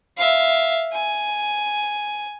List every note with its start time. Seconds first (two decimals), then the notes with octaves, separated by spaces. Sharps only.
0.17 E5 F5
0.93 G#5